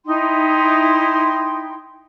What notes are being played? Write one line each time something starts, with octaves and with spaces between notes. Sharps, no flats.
D#4 E4 G5 C6